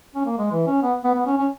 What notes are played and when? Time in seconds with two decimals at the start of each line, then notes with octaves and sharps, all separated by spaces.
0.15 C#4
0.26 A#3
0.38 G#3
0.52 E3
0.67 C#4
0.83 B3
1.04 B3
1.15 B3
1.26 C#4
1.38 C#4